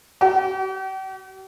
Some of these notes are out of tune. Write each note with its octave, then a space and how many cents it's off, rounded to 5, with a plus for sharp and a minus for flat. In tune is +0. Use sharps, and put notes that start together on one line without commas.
G4 -45